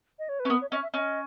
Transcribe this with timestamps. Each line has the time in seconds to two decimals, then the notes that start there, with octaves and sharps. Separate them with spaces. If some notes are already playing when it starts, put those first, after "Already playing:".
0.19 D#5
0.29 C#5
0.40 B4
0.45 C#4
0.50 B3 A#4
0.61 C#5
0.71 C#4 D#5
0.83 E5
0.94 C#4 D#5